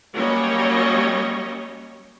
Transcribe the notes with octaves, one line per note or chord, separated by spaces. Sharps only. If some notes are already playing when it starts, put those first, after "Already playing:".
F#3 G3 A#3 C#4 C#5 D#5